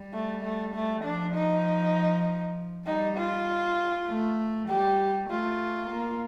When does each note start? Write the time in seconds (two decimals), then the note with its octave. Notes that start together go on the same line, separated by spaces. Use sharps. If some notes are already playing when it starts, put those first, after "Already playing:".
Already playing: G3
0.13 A3
0.43 A3
0.75 A3
1.04 F3 D4
1.34 D#4
2.86 G3 D#4
3.17 F4
4.08 A3
4.69 G3 G4
5.30 A3 F4
5.90 A#3